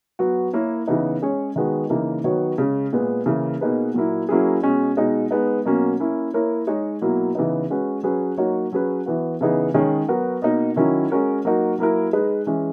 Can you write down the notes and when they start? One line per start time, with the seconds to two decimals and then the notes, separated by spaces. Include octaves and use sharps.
0.19 F#3 B3 F#4
0.53 A#3 E4 A#4 C#5
0.87 C#3 E3 B3 D#4
1.22 G#3 C#4 G#4 C#5
1.56 D#3 G#3 B3 F#4
1.90 C#3 E3 A#3 D#4 A#4
2.24 D#3 F#3 B3 F#4 C#5
2.58 C#3 G#3 C#4
2.93 A#2 G#3 B3
3.26 C#3 E3 A#3
3.61 B2 A#3 D#4 G#4 B4
3.94 A#2 F#3 A#3 E4
4.29 F#3 A#3 C#4 E4 G#4
4.63 B2 G#3 C#4
4.97 B2 G#3 D#4
5.31 G#3 B3 D#4
5.65 B2 F#3 A#3 C#4
6.00 A#3 C#4 E4
6.34 A#3 E4 A#4 C#5
6.67 G#3 D#4 G#4 C#5
7.01 B2 F#3 A#3 E4
7.35 C#3 E3 B3 D#4
7.70 G#3 C#4 F#4 B4
8.03 F#3 C#4 G#4 B4
8.37 F#3 A#3 D#4 F#4 C#5
8.72 F#3 C#4 G#4 B4
9.06 E3 B3 F#4
9.41 C#3 E3 B3 D#4 G#4
9.74 D#3 G#3 C#4 G#4 C#5
10.08 F#3 B3 F#4 A#4
10.42 B2 A#3 D#4
10.76 D#3 F#3 C#4 E4 A#4
11.10 G#3 C#4 F#4 A#4 C#5
11.45 F#3 A#3 D#4 F#4 A#4
11.78 F#3 A#3 E4 A#4
12.13 G#3 D#4 G#4 B4
12.47 E3 G#3 C#4